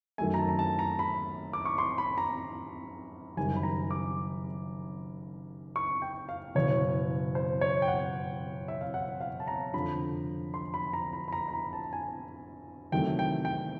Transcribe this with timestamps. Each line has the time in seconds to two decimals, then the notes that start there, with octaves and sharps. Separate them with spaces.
0.18 F#2 D#3 F#3 A3 G#5
0.34 A#5
0.38 A5
0.49 A#5
0.59 A5
0.79 A#5
0.99 B5
1.53 D6
1.65 C#6
1.78 C6
1.98 B5
2.18 A#5
3.37 F#1 F#2 D#3 G3 G#5
3.56 B5
3.63 A#5
3.91 D6
5.76 C#6
6.02 G5
6.29 F5
6.55 F#1 E2 B2 C#5
7.35 C5
7.61 C#5
7.82 G5
7.88 F#5
8.68 E5
8.81 F5
8.94 F#5
9.21 F5
9.40 A5
9.48 A#5
9.74 F1 F2 D3 F3 B5
10.54 C6
10.74 B5
10.93 A#5
11.13 B5
11.28 B5
11.33 A#5
11.48 B5
11.53 A#5
11.73 A5
11.93 G#5
12.92 E2 C3 D#3 F#3 A3 G5
13.19 G5
13.45 G5